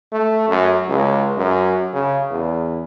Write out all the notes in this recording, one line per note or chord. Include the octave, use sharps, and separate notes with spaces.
A3
F#2
C#2
F#2
C#3
E2